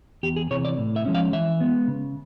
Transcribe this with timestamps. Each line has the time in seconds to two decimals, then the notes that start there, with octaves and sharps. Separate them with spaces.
0.23 E2 G4
0.36 G#4
0.51 C3 E3 C#5
0.65 D5
0.78 A2
0.96 E5
1.06 F3 G#3 C#4
1.14 F5
1.33 E3 E5
1.60 G#3 B3
1.88 C#3